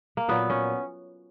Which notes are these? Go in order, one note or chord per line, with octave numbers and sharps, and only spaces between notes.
A#3
A#2 F#3 B3
C#4